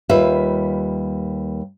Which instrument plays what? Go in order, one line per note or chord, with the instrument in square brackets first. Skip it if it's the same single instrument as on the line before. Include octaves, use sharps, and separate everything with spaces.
[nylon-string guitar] D#2 G3 F4 B4 E5